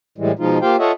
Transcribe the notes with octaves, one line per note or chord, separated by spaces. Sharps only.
A2 E3 G3 G#3
B2 F3 G#3 D#4 F4
A#3 F4 G4 C5 F5 G5
F4 A4 C#5 D#5 E5 F#5